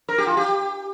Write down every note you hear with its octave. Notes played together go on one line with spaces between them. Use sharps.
A#4
G4
F4
G4